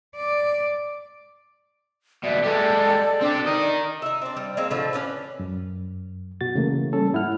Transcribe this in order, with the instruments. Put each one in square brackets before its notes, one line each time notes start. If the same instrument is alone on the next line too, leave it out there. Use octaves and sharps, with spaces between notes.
[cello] D5
[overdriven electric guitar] D#2 B2 [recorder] D5 [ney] E5
[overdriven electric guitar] G#3 G4 [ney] A4
[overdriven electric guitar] C4 G4 [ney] D4
[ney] D#4 [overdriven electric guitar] A#4 D#5
[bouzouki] D#4 E5
C4 D4
G3
G#3 A#3 C4
A2 D3 F3 A3
C#4 D4 B4
[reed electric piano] F#2
B2 F#4 A6
C#3 E3 A3 A#3
G3 C#4 A4
G#2 E4 F#5 F6